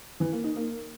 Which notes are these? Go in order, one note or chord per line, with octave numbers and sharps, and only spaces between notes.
E3
A#3
D#4
A#3